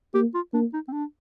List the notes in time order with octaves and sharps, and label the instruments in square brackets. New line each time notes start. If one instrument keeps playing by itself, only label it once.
[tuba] A#3 [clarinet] G4
[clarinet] F4
[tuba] A#3 [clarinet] D4
[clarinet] D#4
C4
D4